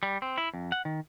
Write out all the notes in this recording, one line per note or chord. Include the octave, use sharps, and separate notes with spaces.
G3
C4
E4
F2
F#5
D#3